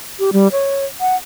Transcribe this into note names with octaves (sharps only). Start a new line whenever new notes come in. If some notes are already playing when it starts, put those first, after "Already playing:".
G4
G3
C#5
F#5